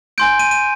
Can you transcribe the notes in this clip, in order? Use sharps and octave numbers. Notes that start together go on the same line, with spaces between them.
G#5 C6 G6 D7
D#7
D#7